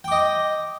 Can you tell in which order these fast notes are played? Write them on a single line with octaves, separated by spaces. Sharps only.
G5 D6 D#5